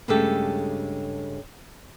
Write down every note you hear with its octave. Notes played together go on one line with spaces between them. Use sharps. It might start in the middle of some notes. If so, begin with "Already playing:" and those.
G2 C#3 G#3 A3 G4 A4